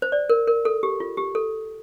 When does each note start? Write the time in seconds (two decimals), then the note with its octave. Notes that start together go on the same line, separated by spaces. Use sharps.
0.02 C5
0.12 D5
0.30 A#4
0.47 A#4
0.65 A4
0.83 G4
1.00 F4
1.17 G4
1.35 A4